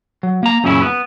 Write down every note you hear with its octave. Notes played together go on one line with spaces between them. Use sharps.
F#3
A#3 A#5
F#2 A#2 C#3 C#4 E4
B3